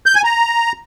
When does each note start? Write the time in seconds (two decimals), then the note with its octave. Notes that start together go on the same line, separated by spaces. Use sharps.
0.06 G6
0.15 G#5
0.24 A#5